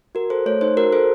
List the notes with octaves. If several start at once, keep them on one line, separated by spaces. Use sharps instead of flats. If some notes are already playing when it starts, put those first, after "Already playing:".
F#4 A#4
A4 C5
A3 C#5
D#4 C5
F#4 A#4
A4 C5